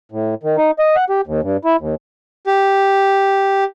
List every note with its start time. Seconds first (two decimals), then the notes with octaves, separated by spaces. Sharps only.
0.12 A2
0.43 D#3
0.57 D#4
0.79 D#5
0.96 F#5
1.10 G4
1.27 D#2
1.42 G2
1.65 E4
1.80 D#2
2.47 G4